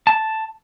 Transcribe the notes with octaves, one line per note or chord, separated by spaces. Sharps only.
A5